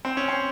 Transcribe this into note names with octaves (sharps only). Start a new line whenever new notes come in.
C4
C#4
C4